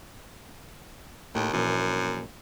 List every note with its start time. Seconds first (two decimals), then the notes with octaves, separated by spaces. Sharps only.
1.35 D#2 A2
1.53 A#1 F#2 E3